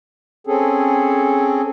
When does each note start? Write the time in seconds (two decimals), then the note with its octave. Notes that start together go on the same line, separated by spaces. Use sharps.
0.47 C4 C#4 G#4 A4